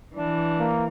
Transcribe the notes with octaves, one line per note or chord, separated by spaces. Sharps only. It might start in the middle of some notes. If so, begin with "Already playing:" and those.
E3 D4
A#3